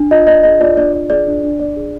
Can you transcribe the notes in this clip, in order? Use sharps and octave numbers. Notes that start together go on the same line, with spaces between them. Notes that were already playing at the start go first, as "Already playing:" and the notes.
Already playing: D4
F4 D#5
D5 D#5
G#4 D#5
F4 D5
D4 D5
D5
G#4 D5
D4
D4
D5
G#4